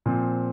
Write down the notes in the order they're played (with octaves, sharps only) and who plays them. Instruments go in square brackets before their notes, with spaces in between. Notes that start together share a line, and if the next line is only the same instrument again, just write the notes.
[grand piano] A#2 F3 C4